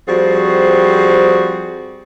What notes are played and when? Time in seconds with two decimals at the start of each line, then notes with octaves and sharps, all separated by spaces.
0.08 F3 G3 C4 F#4 G#4